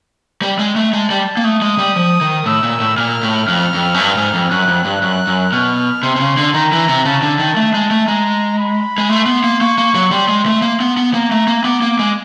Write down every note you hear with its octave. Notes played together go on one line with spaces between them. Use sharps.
G3
G#3
A3
G#3 A5
G3
A#3
A3 D#6
G#3
G3
F3
D#3
A2 E6
A#2
A2
A#2 F6
A2
F2 F6
F2
F#2
G2
G#2
F2
F#2 F#6
F2
G2
F#2 F#6
F#2
B2 F6
C3 C6
C3
C#3
D3
D#3 A#5
E3
C3
C#3 A5
D3
D#3
A3
G#3
A3
G#3 A#5
B5
G#3
A3 C6
B3
A#3
A#3 C#6
A#3
F#3
G3 C6
G#3
A3
A#3
B3
B3
A#3 A#5
A3
A#3
B3 D6
A#3
G#3